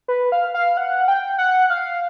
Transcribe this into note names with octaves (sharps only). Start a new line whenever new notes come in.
B4
F5
F5
F#5
G5
F#5
F5